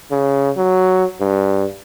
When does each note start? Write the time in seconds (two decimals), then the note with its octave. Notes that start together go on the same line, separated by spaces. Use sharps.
0.11 C#3
0.57 F#3
1.21 G2